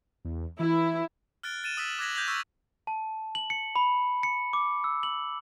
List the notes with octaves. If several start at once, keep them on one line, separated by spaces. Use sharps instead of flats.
E2
E3 E4
F6 F#6 A6 D7 G7
A6 D#7 E7
D#6 E6 A6 B6 E7 F#7
D6 F#6 G#6 A#6 B6 F#7
G6 G#6 A#6 B6 F7 F#7
C#6 E6 F6 A6 B6
A5
F#7
C#7
B5
C#7
D6
E6
F#7